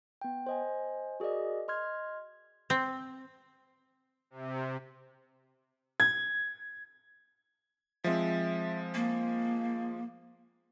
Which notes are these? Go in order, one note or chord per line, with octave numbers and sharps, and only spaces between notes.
B3 G5
C5 D#5 G#5
F#4 G#4 A#4 D5 D#5
D#5 C6 F6 G#6
C4
C3
G#6
F3 G#3 C4 E5
A#3